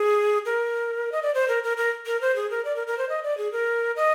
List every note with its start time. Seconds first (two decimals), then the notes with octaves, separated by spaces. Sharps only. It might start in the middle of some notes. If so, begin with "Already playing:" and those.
Already playing: G#4
0.46 A#4
1.12 D#5
1.22 D5
1.34 C5
1.48 A#4
1.63 A#4
1.77 A#4
2.06 A#4
2.21 C5
2.36 G#4
2.50 A#4
2.65 D5
2.76 A#4
2.87 A#4
2.98 C5
3.09 D#5
3.23 D5
3.37 G#4
3.52 A#4
3.96 D#5